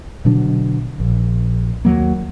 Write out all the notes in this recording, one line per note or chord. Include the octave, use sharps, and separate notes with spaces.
B2 D3 F#3 D4
A#1
D#2 F#3 A#3